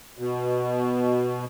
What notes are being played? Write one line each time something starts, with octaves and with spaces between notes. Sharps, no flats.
B2